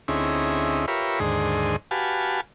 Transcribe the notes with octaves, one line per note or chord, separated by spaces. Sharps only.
D2 C4 C#4 D#4 E4 G#4
F4 G4 A#4 B4 C#5 E5
D#2 G#2 D3 G#4 C5 D#6
F#4 G4 B4 F5 G#5 A5